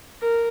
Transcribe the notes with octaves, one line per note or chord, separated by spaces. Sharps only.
A#4